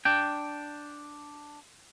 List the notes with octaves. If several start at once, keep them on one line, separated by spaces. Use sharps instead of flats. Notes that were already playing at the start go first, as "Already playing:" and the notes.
D4 G5